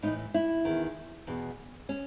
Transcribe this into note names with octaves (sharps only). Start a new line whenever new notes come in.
A2 E3 D#4
E4
E2 D#3
E2 B2
C#4